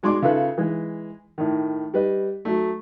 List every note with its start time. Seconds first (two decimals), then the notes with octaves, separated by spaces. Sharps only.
0.03 B2 G#3 D5 C6 D6
0.22 C#3 F4 A4 B4 E5 F#6
0.58 E3 G#3
1.38 A2 D#3
1.94 G3 B4 D#5
2.45 F#3 A3